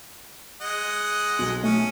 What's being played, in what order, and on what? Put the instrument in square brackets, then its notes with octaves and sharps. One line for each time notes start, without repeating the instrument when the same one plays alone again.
[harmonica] G#3 D#5 F#5
[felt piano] B1 B2
[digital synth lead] A3 [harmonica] C#4